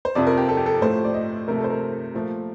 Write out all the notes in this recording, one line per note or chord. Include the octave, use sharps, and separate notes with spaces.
C5
F2 C3 F3 D5
A#4
G4
A4
G4
A4
A2 F3 A3 C5
D5
D#5
C3 F3 A3 A#4
A4
C5
A#4
A#2 F3 A3